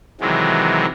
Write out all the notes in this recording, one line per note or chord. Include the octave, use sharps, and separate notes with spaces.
C3 D#3 E3 F#3 G#3